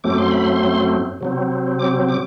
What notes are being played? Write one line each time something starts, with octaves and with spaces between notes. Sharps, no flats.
F#2 F#3 A3 C4 D6
C6
B5
C6
C3 F#3 C4
D6
D6